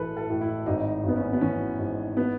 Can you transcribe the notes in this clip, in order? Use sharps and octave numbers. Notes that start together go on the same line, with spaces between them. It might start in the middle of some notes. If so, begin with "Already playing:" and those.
Already playing: A1 E3 A4 B4
A4
A2
E4
G#1 D#4
G#1 B3
C#4
B3
E3 C#4
G#2
B3